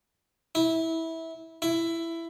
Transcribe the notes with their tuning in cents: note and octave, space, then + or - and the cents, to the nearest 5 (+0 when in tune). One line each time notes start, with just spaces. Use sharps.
E4 -20
E4 +10